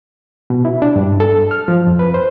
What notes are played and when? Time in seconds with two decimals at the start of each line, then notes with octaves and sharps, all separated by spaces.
0.50 B2
0.65 E4
0.82 D4
0.96 G2
1.20 A4
1.51 F6
1.68 F3
1.87 F2
1.99 B4
2.14 C5